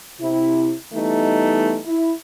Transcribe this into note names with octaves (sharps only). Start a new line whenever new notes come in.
C3 E4
E3 G3 A3 B3 D#4
E4